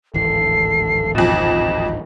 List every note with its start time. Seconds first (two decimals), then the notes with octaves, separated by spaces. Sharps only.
0.14 D1 G#1 E3 A4 C7
1.15 F2 B2 D#4 E7